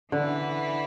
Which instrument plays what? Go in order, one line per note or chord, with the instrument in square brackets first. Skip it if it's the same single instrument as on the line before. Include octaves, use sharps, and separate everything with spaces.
[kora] D3 [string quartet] E3 B3 E4